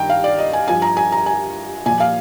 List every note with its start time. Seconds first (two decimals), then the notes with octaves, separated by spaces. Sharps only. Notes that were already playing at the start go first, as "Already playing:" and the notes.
Already playing: G2 D#3 G5 A#5
0.09 F5
0.24 D5
0.38 D#5
0.53 G#5
0.68 G2 F3 G#5
0.82 A#5
0.97 G#5
1.12 A#5
1.26 G#5
1.86 A#2 F3 G#5
2.00 F5